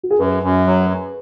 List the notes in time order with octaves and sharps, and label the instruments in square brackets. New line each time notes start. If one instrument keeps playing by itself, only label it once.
[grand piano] F#4
G#4
[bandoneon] F#2 [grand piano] B4
[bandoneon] F#2
F#3